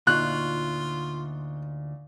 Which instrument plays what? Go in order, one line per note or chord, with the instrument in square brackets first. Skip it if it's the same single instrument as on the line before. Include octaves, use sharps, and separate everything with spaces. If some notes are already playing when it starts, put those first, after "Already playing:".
[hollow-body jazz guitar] D2 [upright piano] A#2 D#4 C#6 [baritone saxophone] F4 [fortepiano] F#6